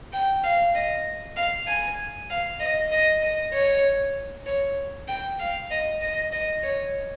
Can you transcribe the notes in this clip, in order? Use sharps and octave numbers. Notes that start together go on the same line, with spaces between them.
G5
F5
D#5
F5
G#5
F5
D#5
D#5
D#5
C#5
C#5
G5
F5
D#5
D#5
D#5
C#5